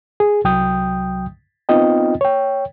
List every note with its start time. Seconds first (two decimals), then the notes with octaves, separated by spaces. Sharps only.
0.20 G#4
0.44 C2 F#3 G5 D#6 G6
1.69 B3 C4 D#4 F4 D#5 G5
2.21 C#5 G5